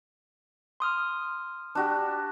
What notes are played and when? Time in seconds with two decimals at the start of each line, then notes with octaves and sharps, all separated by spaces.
0.80 C6 D#6 F6
1.75 D4 F#4 G4